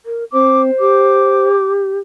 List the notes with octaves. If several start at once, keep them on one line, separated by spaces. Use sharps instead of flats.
A#4
C4 C5 D6
G4 D6